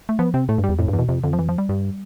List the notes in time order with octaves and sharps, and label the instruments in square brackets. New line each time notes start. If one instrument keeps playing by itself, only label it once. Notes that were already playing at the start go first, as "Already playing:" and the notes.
[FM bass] A3
[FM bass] F3 [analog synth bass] B3
[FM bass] C3 [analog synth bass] C4
[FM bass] A2 [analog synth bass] A3
[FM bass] G2
[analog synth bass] G3
[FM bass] E2
[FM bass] F2 [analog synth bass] A2
[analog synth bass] E2 [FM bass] G2
[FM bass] B2
[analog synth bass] F2 [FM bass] C3
[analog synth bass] F2 [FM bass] D3
[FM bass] F3
E3
F3
G3
[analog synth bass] G2